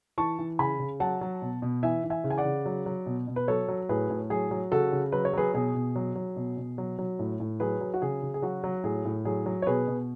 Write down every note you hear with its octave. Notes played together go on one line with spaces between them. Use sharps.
E3 A5 C#6
E3
C#3 G#5 B5
C#3
F#3 F#5 A5
F#3
B2
B2
E3 E5 G#5
E3
E5 G#5
C#3
G#5
D5 F#5
C#3
F#3
F#3
B2
B2
B4
F#3 A4 C#5
F#3
A2 G#4 B4
A2
F#3 G#4
F#3
C#3 F#4 A4
C#3
F#3 B4
C#5
F#3 G#4 B4
B2 G#4
B2
F#3
F#3
B2
B2
F#3
F#3
A2
A2
F#3 G#4 B4
F#3
F#4
C#3 G#4
C#3
G#4
F#3 F#4
F#3
A2 G#4
A2
F#3 G#4
F#3
C#5
B2 G#4 B4
B2